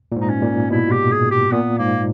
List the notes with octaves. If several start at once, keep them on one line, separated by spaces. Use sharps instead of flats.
A#2
G#2
D#4
C#4
A#2
B2 E4
G4
G#4
G4
A#2 B3
G#2 A#3